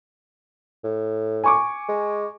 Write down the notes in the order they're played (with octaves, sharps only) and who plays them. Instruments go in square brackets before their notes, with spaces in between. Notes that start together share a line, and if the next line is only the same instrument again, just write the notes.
[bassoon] A2
[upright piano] G#5 C#6 D6
[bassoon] G#3